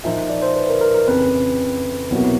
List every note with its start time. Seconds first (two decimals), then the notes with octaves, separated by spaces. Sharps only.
0.04 A#2 F3 A#3 D#4 E5
0.29 D5
0.42 C5
0.56 B4
0.69 A#4
0.81 A#4
0.94 A#4
1.07 F2 C#3 E3 B4
2.10 C2 B2 F#3 A#3